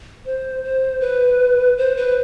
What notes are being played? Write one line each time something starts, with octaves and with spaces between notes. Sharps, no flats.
C5
C5
B4
C5
B4